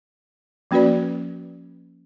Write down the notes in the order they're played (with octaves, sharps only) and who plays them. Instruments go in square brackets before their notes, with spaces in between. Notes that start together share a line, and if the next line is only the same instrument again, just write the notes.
[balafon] F3 A#3 C#4 F#4 B4 D5